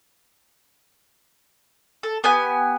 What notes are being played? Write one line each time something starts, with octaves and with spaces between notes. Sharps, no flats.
A4
B3 G4 G#5